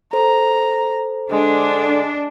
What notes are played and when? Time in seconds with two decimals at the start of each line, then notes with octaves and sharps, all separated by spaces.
0.13 A4 C5 A#5
1.31 D3 G#3 D4